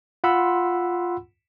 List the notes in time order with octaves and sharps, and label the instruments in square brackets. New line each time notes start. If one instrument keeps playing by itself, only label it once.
[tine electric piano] F4 F#5 B5 C6 E6